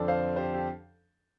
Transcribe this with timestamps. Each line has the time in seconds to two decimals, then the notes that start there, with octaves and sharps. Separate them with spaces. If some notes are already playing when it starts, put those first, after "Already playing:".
Already playing: F2 D3 F3 C4 A4 D5
0.08 C5 F5
0.36 G4 C5
0.54 G4